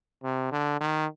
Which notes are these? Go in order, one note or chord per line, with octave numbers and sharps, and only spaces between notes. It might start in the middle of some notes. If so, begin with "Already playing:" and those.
C3
D3
D#3